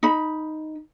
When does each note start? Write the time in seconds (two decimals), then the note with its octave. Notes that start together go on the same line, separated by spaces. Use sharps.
0.03 D#4 B5